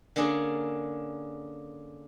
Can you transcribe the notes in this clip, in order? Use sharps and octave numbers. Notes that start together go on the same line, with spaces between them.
D3 A#3 C#4 D4 G#4 A#4